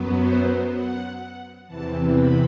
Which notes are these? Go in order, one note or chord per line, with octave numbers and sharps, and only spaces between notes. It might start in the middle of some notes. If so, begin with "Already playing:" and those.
Already playing: F#2 F#3 B3
C5
F#5
E2 C3 E3 A5
B5